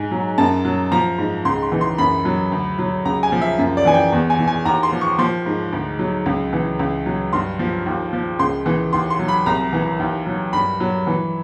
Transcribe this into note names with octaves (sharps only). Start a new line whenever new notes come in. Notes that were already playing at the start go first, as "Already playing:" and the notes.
Already playing: G#2 G#5
F#3
F#2 A5
F#3
F3 A#5
G#2
C#2 C6
C6
E3
C6
F#2 B5
F#3
D2
F#3
C#2 A#5
G#5
F3
E5
F#2
D5
E3 G#5
G5
E2
G#5
E3
G#5
D#2 A#5
C6
F3
C#6
F3 C6
G#2
D2
F#3
C#2
E3
C#2
F#3
G2 C6
F3
D#2
F3
C#2 C6
E3
D#2 C6
C6
F#3
B5
C2 A#5
E3
D#2
F#3
G2 B5
F#3
E3